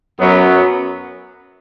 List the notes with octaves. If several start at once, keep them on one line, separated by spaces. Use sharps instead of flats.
F#2 F#3 B3